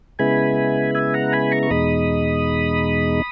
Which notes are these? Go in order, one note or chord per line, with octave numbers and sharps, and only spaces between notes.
C#3 G#3 B3 E4 G#5 B5
E5 G#5
F#5 A#5
G#5 B5
A#5 C#6
C#6
E2 B2 G#3 D#4 B5 D#6